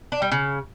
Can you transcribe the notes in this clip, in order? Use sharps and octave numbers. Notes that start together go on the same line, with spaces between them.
D4
G3
C#3